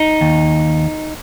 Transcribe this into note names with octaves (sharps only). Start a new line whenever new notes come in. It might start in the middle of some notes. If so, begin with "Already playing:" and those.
Already playing: D#4
D#2